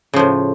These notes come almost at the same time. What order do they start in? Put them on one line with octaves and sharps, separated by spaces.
C#3 F3 A2